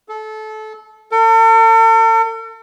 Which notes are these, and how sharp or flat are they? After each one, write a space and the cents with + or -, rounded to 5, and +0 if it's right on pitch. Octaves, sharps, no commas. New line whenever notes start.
A4 -25
A4 +45